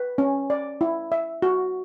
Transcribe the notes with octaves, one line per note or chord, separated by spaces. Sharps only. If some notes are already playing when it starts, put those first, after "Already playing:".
Already playing: B4
C#4
D5
E4
E5
F#4